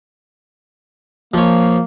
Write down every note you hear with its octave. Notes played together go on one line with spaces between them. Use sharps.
F3 A#3 C#5